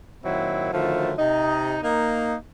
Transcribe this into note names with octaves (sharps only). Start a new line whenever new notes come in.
A#2 D#3 F#3 C4 E4
D3 D#3 F3 F#3 A3
C3 D#4
A#3 D#4